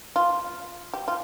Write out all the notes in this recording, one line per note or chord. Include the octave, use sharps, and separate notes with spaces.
F4
G4
F4